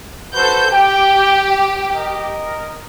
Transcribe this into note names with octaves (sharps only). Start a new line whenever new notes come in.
F#4 A4 B4 C5 G6
G4 G5
A#4 D#5